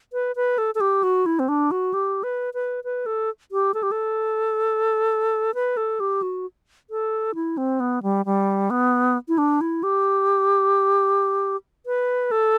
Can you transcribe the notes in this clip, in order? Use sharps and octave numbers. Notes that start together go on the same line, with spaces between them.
B4
B4
A4
A4
G4
F#4
E4
C4
D4
F#4
G4
B4
B4
B4
A4
G4
A4
G4
A4
B4
A4
G4
F#4
A4
E4
C4
B3
G3
G3
B3
E4
D4
E4
G4
B4
A4